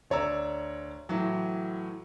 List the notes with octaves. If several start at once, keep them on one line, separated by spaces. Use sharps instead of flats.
D2 C#5 D5 A#5 E6
A2 E3 F#3